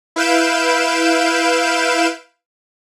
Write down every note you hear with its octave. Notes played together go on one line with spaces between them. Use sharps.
E4 B4 F5 G6 D7 E7